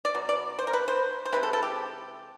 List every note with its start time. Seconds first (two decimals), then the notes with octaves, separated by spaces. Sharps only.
0.05 D5
0.15 B2 F#3
0.29 D5
0.59 C5
0.67 A#4
0.73 B4
0.88 C5
1.25 C5
1.32 C3 E3 G#3 C4 B4
1.43 A4
1.53 A4
1.63 G4